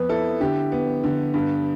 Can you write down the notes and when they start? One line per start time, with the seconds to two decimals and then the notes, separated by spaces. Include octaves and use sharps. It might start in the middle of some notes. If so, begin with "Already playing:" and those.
Already playing: F2 B3 B4
0.09 E4 A4
0.40 D3 G4
0.72 B3
1.04 D3
1.34 G2